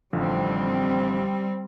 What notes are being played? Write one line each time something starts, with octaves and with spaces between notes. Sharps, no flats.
A1 D3 F3 G3 C4